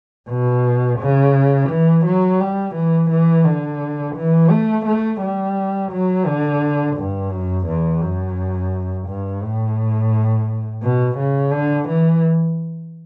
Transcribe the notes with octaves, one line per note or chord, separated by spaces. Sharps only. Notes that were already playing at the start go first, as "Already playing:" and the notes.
B2
C#3
E3
F#3
G3
E3
E3
D3
E3
A3
A3
G3
F#3
D3
G2
F#2
E2
F#2
G2
A2
B2
C#3
D3
E3